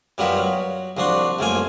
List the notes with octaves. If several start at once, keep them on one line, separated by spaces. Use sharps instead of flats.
F#2 G3 B3 F4 A#4 B4
F#3
C2 F3 D4 F#4 C6
C2 F#2 A3 A#3 F4 G#5